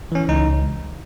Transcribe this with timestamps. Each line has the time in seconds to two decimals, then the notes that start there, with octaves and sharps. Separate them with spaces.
0.12 E3 C#4
0.28 C#2 D#4
0.46 C#2